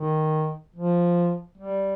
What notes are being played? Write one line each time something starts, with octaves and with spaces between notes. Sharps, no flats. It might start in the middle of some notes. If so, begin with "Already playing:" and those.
Already playing: D#3
F3
G3